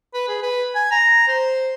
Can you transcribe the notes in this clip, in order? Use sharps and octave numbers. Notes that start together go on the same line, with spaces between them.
B4
G#4
B4
G#5
A#5
C5